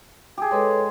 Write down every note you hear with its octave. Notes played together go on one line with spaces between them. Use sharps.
G4 G#4
G#3 A4 B4 C#5